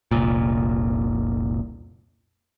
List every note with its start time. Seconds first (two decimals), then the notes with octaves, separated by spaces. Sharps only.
0.11 F1 C2 A#2